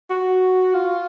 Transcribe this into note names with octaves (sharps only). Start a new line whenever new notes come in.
F#4
F4